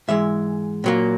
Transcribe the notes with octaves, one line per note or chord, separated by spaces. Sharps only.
G#2 E3 G#3 E5
A#2 F#3 A#3